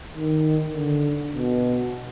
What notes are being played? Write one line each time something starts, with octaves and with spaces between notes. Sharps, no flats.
D#3
D3
B2